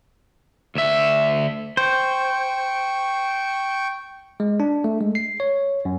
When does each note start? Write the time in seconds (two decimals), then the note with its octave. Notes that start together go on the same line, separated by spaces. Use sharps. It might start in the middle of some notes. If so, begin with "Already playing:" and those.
0.75 D2 E5
1.77 C5 G5 C#6
4.40 G#3
4.60 D4
4.84 A3
5.01 G#3
5.15 C7
5.40 C#5
5.85 F#2